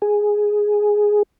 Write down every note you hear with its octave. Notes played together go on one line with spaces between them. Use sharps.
G#4